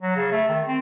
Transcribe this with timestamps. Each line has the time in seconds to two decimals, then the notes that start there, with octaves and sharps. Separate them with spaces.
0.02 F#3
0.16 C#3
0.32 A3
0.49 D#3
0.67 C4